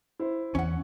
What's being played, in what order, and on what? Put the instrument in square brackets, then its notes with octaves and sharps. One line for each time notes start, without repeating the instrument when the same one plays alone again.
[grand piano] E4 C5
[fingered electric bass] E2 [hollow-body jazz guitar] C#4 F#5